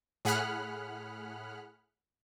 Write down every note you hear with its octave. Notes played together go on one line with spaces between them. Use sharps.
A2 G#4 F#5 B5 F6 F#6